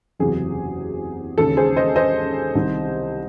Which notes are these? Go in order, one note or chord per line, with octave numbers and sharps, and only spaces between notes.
F#1 E2 C3 F#3 G#4
E1 D#2 C#3 A4
G#4 C5
C5 D#5
C5 D#5
C2 C3 D#3